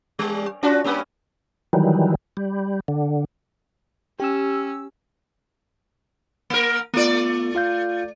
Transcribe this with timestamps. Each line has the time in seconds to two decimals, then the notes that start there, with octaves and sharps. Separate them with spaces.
0.19 G3
0.63 C#4 F4 F#4
0.84 G2 A#3 C#4
1.73 D#3 E3 F#3 G3
2.37 G3
2.88 D3
4.20 C#4 G4 E6
6.50 A#3 A#4
6.94 A3 B3 F4 D5
7.55 F4 F5 G6